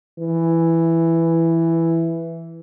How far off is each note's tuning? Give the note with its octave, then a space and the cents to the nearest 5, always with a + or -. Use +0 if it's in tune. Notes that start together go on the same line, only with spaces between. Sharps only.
E3 +5